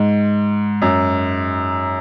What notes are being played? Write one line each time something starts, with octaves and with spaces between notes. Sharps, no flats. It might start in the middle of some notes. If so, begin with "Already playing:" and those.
Already playing: G#2
F#2